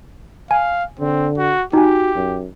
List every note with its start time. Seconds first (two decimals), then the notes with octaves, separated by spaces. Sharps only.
0.51 F5 G#5
1.00 D3 C4
1.38 F#4
1.73 D#4 F#4 G4 G#5
2.15 F#2